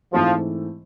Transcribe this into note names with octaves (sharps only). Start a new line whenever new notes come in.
G#2 E3 F3 A3 C4